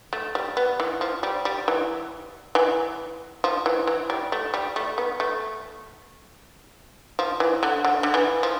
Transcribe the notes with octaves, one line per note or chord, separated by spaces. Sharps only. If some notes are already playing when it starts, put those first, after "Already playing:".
A3
G3
B3
E3
F3
G3
G3
E3
E3
F3
E3
E3
G3
A3
G3
A3
B3
A3
F3
E3
D3
D3
D3
E3
F3